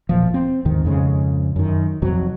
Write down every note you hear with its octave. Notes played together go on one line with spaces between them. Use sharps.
E1 A#2 F3
C4
D#2 G#2 D#3
F2 G#2 C#3 G#3
F#2 D#3
F2 C3 F#3